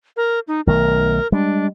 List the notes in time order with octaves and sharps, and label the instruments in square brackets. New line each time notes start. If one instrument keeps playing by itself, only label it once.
[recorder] A#4
D#4
[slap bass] B1 D#3 A3 [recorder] A#4
[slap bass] G3 G#3 [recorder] D4